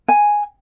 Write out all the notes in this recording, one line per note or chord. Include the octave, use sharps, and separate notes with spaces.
G#5